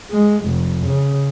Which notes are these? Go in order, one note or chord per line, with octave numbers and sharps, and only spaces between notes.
G#3
F1
C#3